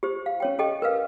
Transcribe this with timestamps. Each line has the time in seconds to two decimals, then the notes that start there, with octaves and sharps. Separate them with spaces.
0.03 G4 C5
0.26 F5
0.40 C#4 C#5 G5
0.59 G4 A4 D#5 G5
0.82 A#4 B4 F5